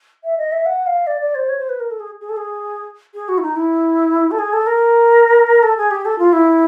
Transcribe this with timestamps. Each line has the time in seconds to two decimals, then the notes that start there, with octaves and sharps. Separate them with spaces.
0.24 E5
0.37 D#5
0.52 E5
0.65 F#5
0.86 F5
1.06 D5
1.21 D5
1.34 C5
1.49 C#5
1.58 C5
1.69 B4
1.79 A#4
1.90 A4
2.00 G#4
2.20 G#4
2.29 A4
2.36 G#4
3.14 G#4
3.28 F#4
3.37 E4
3.42 D#4
3.56 E4
4.31 A4
4.38 G#4
4.53 A4
4.66 A#4
5.63 A4
5.77 G#4
5.90 G4
6.05 A4
6.18 F4
6.32 E4